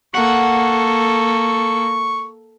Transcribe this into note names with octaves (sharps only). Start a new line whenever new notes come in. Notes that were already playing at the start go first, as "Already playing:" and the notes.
A#3 A4 F#5 C#6